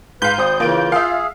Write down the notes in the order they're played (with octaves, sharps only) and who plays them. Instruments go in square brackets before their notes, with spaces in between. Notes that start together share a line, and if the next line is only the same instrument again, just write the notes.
[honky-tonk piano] G#2 F5 [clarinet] B4 [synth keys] G6
[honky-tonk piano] G#1 D#6 [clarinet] C5
[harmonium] C#3 E3 [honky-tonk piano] A#3 D7 [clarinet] F4
[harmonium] G#4 [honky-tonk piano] E5 F5